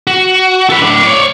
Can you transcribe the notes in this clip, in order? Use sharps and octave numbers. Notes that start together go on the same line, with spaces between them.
F#4
A4 B4
A2 D4
C#5 D5